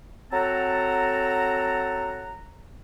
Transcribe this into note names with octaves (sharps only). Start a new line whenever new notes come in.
F#3 C4 A4 F#5 A5 A#5